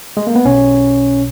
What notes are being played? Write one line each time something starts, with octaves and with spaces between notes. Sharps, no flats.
G#3
A#3
B3
B1 B2 C#4